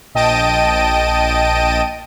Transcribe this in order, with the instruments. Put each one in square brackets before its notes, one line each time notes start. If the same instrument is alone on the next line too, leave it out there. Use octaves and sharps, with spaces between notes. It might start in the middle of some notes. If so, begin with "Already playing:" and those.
[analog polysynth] A#1 D#5 G5 A5 D7 D#7